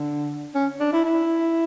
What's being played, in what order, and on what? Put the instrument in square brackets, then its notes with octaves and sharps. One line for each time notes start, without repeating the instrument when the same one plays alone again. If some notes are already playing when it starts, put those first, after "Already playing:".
Already playing: [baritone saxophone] D3
C#4
D4
E4
E4